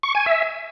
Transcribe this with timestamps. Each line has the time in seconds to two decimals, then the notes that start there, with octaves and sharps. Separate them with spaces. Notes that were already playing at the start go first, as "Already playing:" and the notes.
0.03 C#6
0.15 G#5
0.26 E5